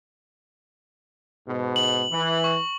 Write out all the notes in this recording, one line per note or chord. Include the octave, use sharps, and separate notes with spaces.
G#2 B2
F#7
E3
C#6